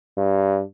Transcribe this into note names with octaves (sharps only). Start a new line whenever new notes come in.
G2